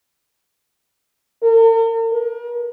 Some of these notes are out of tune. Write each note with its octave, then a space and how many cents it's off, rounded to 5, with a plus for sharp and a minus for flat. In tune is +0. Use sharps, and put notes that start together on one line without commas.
A#4 -45
A#4 +40